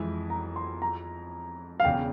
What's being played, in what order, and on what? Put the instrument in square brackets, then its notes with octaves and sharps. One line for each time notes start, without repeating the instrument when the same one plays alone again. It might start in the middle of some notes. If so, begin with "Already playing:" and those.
Already playing: [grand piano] F2 E3 G#3 E4
[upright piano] A#5
C6
A#5
F5
[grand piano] E1 E2 C#3 [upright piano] G5